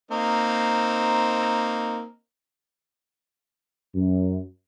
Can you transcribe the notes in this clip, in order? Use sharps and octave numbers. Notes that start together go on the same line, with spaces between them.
A#3 C4 D#4
F#2